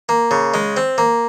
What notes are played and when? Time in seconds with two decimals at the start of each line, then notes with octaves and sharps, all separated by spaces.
0.09 A#3
0.31 C#3
0.54 G#3
0.77 C4
0.98 A#3